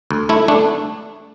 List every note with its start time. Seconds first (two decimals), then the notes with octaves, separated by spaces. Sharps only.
0.11 D2
0.29 A3 E4
0.48 A3 D4